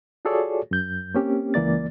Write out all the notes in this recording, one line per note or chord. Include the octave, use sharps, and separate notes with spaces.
F4 F#4 G#4 A4 C#5 D5
F#2 G6
A#3 C4 C#4 G4
C#2 E3 A#3 D5 A6